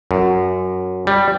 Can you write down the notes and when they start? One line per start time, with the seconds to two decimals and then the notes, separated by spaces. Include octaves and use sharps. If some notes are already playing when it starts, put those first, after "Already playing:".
0.11 F#2
1.07 G3